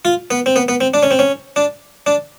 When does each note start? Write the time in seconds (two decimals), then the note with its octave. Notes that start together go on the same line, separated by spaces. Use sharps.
0.05 F4
0.31 B3
0.46 C4
0.56 B3
0.68 B3
0.81 C4
0.94 D4
1.03 C#4
1.11 C4
1.19 C#4
1.56 D4
2.06 D4